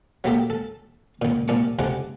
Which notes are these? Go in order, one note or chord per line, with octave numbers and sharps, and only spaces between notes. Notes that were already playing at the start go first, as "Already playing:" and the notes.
F#3 A3 A#3 G4 A4 E5
A4
C#2 A#2
C2 A#2 A5 C#6 D6
C#2 C3 G#3 A4 F#5 D6